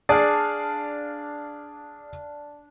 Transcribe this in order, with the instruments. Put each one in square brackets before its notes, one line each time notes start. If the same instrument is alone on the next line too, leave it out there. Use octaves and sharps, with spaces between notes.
[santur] D4 F5 [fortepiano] G#4 D5